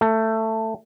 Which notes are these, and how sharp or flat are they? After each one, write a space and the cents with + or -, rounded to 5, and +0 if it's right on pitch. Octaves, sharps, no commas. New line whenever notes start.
A3 +15